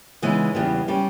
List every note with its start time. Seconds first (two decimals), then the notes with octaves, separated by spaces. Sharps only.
0.22 C#3 E3 G#3 B3 D#4
0.55 E2 C#3 G3 B3
0.88 G3 C#4